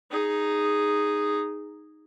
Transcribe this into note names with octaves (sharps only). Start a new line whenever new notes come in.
D#4 G#4